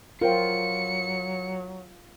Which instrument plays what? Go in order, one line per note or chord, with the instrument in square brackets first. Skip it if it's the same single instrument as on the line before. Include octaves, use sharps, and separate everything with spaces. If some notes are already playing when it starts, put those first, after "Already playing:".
[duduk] F#3 [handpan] F4 [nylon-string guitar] A#4 C5 G5 [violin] C#7